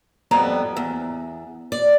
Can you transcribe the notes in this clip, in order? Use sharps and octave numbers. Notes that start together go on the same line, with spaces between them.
F2 G3 B3 A#5
E2
D5